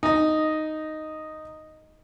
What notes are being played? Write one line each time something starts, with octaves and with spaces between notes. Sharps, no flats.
D#4 D#5